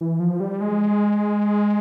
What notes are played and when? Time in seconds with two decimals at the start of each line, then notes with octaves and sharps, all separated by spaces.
0.01 E3
0.20 F3
0.40 G3
0.61 G#3